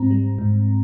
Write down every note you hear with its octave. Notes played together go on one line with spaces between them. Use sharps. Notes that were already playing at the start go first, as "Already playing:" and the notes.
Already playing: G#2 C4 A#5
G3
G#2